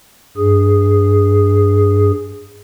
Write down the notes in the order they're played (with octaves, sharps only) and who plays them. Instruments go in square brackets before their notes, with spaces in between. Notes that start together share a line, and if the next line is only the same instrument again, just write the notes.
[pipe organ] G2 G#4